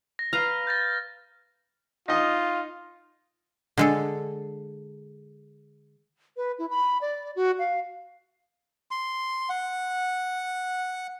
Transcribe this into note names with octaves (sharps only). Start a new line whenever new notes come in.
A#6
B4 F5 A#5 F6
G6 A6 A#6
D#4 F4 D#5
D3 G#3 A4
B4
E4
B5
D5
F#4
F5
C6
F#5